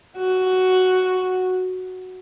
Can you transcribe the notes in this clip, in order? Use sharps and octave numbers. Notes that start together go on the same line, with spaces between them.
F#4